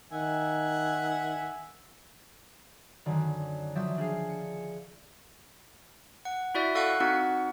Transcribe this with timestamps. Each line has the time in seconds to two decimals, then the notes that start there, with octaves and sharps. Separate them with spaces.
0.12 D#3 E5 F#5 G#5
3.06 F#2 D3 D#3 D5
3.75 F3 F#3 D5 E5 D#6 G6
3.98 D4 G#4 F5
4.29 C#7
6.25 F#5
6.55 E4 F#4 D5 E5
6.75 A4 F5 F#5 C#6 F#6
7.00 C4 D#4 F#4 F#5